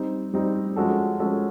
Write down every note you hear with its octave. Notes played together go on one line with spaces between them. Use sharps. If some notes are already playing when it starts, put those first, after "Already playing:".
Already playing: G3 C4 D#4
G3 C4 D#4
F3 G#3 C#4 F#4 A4
F3 G#3 C#4 F#4 A4